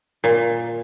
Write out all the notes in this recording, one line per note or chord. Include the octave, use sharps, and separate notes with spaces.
A#2